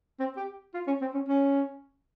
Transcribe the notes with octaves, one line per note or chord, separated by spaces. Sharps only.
C4
G4
F4
C#4
C4
C#4
C#4